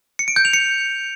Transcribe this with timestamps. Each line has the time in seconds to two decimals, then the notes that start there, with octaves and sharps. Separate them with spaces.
0.19 C#7
0.28 D7
0.36 G6
0.45 F7
0.53 C#7